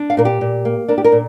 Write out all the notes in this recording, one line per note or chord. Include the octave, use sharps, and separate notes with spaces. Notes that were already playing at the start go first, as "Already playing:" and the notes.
Already playing: D4
F5
A#2 A#4
G4
A#2
A#3
D4 A#4
G4
A#4
A#2